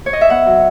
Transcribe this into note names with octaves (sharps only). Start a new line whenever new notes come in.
C#5
D#5
E5
B3 F#5
F#3